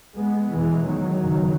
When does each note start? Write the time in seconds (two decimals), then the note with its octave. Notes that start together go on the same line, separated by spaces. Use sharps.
0.17 G#3 B3
0.52 E2 B2 E3 G#3
0.86 D#3 F#3
1.21 F#2 C#3